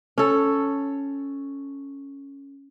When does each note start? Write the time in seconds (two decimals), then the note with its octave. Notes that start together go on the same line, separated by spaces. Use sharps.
0.18 C#4 A4